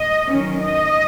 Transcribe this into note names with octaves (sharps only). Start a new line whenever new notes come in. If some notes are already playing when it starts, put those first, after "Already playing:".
Already playing: D#5
D#3 F#3 C#4
D#5